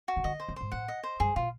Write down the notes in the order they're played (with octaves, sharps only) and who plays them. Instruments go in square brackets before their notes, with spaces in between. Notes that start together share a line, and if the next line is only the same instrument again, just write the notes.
[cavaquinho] F#4
[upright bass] C#3
[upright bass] D3 [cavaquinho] D#5
[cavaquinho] C5
[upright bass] C#3
[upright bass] G#2 [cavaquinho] C5
[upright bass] A2 [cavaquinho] F#5
[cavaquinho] D#5
C5
[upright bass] G2 [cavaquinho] G#4
[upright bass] B2 [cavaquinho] F4